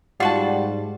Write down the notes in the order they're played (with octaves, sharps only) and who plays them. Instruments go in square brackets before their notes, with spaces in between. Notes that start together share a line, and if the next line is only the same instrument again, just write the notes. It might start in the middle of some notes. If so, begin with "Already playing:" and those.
[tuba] G#2 [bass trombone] G3 [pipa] F4 F#4 A5 [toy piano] F#5